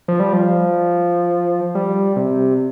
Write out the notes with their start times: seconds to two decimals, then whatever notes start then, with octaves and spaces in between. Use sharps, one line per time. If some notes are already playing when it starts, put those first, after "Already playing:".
0.08 F3
0.20 G3
0.33 F3
1.75 G3
2.16 C3